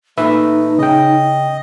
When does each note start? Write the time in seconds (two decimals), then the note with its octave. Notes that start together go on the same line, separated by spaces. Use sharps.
0.18 A#2 A3 D#4 B4 E5
0.79 C#3 D#5 G5